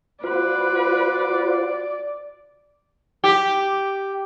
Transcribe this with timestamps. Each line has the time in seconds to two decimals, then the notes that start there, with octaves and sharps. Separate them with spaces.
0.24 F4 F#4 B4 C5 D5
3.24 G4